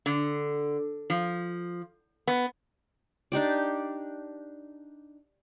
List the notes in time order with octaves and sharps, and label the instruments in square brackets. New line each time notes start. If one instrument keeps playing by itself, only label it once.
[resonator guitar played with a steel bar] D3
F3
B3
[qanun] D4 D#4 G4 D5